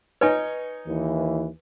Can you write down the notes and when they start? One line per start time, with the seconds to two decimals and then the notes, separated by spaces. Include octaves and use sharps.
0.21 D#4 B4 C#5 G#5
0.87 D#2 E3